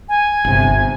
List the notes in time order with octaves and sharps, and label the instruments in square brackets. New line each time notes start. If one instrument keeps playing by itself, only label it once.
[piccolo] G#5
[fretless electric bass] G1 C3